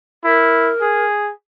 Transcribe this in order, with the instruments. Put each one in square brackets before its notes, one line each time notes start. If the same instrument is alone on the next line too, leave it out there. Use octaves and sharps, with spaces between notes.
[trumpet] E4 [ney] A#4
[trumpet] G#4